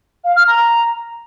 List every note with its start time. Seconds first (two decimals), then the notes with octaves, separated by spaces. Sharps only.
0.24 F5
0.36 F6
0.48 A#5